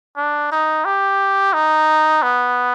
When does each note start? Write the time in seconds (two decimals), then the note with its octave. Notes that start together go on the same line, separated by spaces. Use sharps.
0.17 D4
0.52 D#4
0.85 G4
1.53 D#4
2.23 B3